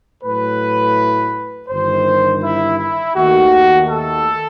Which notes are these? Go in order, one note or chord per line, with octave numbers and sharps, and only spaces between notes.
A2 F#3 A3 B4
G1 G2 D#3 C5
E4
E4
D#2 D#3 A3 F#4
A4